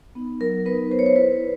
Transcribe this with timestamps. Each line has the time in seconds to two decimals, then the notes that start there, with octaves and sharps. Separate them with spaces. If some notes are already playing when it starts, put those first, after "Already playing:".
0.15 B3 D#4
0.40 F#3 A#4
0.65 B3 D#4 B4
0.90 B3 C5
0.99 C#5
1.06 C5
1.16 E4 B4